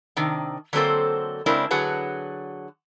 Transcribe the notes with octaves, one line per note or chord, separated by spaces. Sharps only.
C3 D#3 D4
D3 F#3 A#3 C4 A4 C5
C#3 G#3 C4 D4 E4 A#4
D3 F#3 F#4 G#4 B4 A5